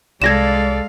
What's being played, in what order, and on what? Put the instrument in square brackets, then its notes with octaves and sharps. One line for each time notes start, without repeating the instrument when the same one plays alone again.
[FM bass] C2 [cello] G#3 F5 [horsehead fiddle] A4 D5 [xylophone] G#6 A#6 E7